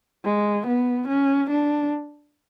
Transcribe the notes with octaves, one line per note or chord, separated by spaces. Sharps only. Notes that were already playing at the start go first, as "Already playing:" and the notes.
G#3
B3
C#4
D4